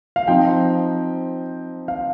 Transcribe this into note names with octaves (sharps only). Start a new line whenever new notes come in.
F5
F3 C4 D#4 G5
F5